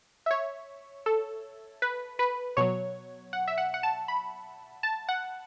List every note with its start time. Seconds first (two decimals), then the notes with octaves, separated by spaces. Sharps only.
0.26 E5
0.31 C#5
1.06 A4
1.82 B4
2.19 B4
2.57 B2 F#3 C#5
3.33 F#5
3.48 E5
3.58 F#5
3.74 F#5
3.83 A5
4.08 B5
4.83 A5
5.09 F#5